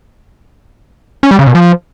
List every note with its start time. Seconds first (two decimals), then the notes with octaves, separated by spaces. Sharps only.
1.23 C#4
1.31 G3
1.39 C#3
1.47 B2
1.55 F3